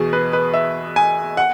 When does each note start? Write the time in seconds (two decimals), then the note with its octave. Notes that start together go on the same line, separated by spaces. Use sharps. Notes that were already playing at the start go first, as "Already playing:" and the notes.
Already playing: E2 B2 G#4
0.13 B4
0.33 B4
0.54 E5
0.96 G#5
1.37 F#5